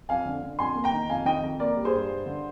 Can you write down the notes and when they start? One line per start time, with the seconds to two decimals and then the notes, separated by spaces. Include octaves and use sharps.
0.09 F2 F5 G#5
0.26 D3
0.43 D3
0.59 F2 G#5 C6
0.75 A#3
0.84 G5 A#5
0.93 D#3
1.10 F2 F5 G#5
1.25 D#3 D#5 G5
1.42 F2
1.60 A#3 A#4 D5
1.77 G3
1.85 G#4 C5
1.92 G2
2.09 G2
2.26 D3